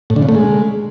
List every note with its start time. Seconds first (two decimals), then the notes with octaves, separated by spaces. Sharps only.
0.10 A2
0.16 D3
0.22 C#3
0.29 A3
0.35 G#3